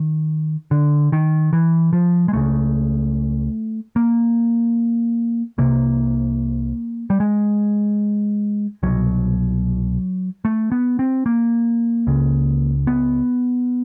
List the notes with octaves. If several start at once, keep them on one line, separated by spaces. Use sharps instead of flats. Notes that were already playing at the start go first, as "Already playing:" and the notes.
Already playing: D#3
D3
D#3
E3
F3
G#3
C#2 C#3 A3
A#3
C2 C3 A#3
G3
G#3
C2 B2 F#3
A3
B3
C4
A#3
C#2 C#3
B3